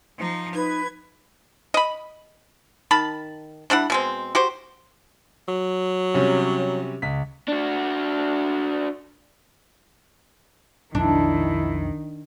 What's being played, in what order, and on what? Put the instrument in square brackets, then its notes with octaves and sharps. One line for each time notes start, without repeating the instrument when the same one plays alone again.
[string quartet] F3 D#4
[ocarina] D#4 [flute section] B4 [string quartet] G#6
[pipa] D#5 B5
D#3 A5 B5
G3 D4 E4 F#5
B2 G#3 C4
F#4 G4 C5
[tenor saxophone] F#3
[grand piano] C3 G3 C#4
C#2 B6
[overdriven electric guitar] D4 F#4
[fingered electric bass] B1 F2 F3 [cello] D#3 [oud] D4 [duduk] E4